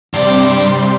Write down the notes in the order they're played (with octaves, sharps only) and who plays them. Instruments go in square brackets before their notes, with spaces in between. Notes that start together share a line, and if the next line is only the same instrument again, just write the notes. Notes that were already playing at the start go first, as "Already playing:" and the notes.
[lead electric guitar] G2 D5 [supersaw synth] C3 G3 C6